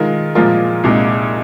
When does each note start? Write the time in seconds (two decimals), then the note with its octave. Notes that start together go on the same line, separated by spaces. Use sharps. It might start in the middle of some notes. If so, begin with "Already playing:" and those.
Already playing: D#3 G#3 F4 A#4
0.35 A#2 F3 G#3 F4 A#4
0.84 C2 A#2 G#3 D#4